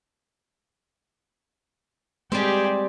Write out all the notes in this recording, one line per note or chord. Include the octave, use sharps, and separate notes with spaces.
G3 G#3 C4 G4 G#4